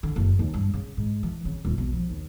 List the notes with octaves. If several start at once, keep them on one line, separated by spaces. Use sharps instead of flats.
D3
F#1
D#2
G2
C#3
G#2
E3
C#3
D#1
B1
F3
D#2